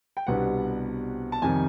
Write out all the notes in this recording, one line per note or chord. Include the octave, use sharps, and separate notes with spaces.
G5
C2 B2 G3 B3 D4 F#5
A5
F2 C3 D#3 G3 G#5